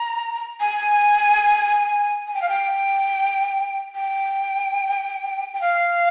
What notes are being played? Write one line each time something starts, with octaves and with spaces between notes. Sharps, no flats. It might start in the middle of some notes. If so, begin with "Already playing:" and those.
Already playing: A#5
G#5
G#5
G5
F5
G5
G5
G5
F5